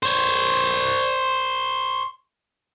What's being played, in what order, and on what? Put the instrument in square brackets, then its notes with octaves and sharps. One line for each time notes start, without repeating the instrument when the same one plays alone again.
[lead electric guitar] C5 C#5